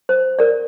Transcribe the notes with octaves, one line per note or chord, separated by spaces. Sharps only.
C5
A#4 D5